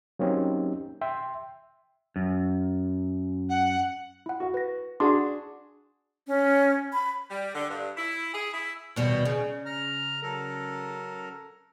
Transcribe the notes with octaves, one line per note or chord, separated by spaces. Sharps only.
F#3 A#3 C4 C#4 D#4 G4
E5 G5 C6
F#2
F#5
E4 F#5
F#4
B4 A#6
D4 F#4 G#4 C6
C#4
B5
G3
D3
G2
E4
G#4
E4
D#2 B2 G3
C#3
A#5 F6
F#3 A4 A#4